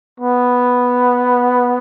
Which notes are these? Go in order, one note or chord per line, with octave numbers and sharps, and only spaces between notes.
B3